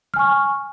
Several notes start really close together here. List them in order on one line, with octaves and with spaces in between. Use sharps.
F6 G#5 C#6